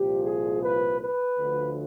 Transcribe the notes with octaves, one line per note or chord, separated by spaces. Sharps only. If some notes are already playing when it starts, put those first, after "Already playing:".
Already playing: C2 A#2 F3 G4
G#4
B4
B4
D2 D3 F3